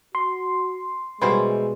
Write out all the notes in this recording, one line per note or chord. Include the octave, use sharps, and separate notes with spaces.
F#4 C6
B2 E3 G3 G#3 E4 A#4 C5